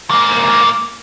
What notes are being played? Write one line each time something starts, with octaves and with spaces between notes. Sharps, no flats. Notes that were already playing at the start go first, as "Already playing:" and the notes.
G#2 A#3